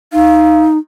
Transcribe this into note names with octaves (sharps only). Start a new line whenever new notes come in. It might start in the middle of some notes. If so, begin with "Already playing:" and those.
D#4 F5